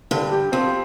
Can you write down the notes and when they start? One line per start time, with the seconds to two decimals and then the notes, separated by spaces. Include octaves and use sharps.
0.11 G2 D3
0.31 G4
0.52 F2 C4